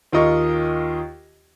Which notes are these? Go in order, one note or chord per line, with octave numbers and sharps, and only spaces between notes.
D#2 F4 A#4 D#5 C#6